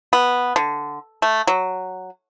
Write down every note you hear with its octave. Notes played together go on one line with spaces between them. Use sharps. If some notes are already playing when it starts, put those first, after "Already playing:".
B3
D3
A3
F#3